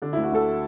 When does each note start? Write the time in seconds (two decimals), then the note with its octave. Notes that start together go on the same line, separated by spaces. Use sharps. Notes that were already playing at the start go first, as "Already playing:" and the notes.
0.02 D3 D4
0.13 D2 E4
0.23 F#4
0.32 D2 A4